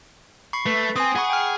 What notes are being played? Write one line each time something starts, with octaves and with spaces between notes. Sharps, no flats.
B5 C#6 C7
A3 B4
C4 G#5 D#6
G#4 F#5 B5 C#6
G5 F6